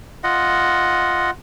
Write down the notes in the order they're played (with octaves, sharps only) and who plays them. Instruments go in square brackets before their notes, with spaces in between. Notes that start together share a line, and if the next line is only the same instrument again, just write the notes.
[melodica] F4 D#5 F#5